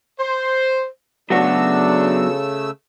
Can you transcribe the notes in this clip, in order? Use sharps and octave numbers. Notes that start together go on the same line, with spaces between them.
C5
C#3 F#3 A3 B3 D4 F#4 E6